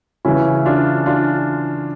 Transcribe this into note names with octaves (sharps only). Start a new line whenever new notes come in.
C#3 E3 C#4 E4
D4 F4
D4 F4